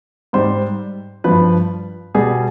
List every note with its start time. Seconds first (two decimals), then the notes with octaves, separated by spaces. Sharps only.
0.33 G#2 G3 C5
1.24 G2 F3 B4
2.15 B2 G3 G#4